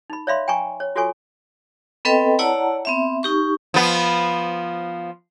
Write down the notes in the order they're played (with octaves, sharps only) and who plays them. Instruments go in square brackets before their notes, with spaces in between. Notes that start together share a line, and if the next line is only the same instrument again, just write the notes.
[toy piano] D#4 B5
C#5 D5 E5 F5 B5 C6
G5 G#5 A#5 C#6
C#5
F4 F#4 A4 C#5 G#5 C#6
[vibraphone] B3 C4 A4 B4 D#5 G5
E4 C#5 D5 F#5 A5 A#5
B3 C4 E5
D#4 G4 C#6
[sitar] F3 B3